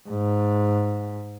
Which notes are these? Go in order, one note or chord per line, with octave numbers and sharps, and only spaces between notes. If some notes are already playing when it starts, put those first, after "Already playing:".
G#2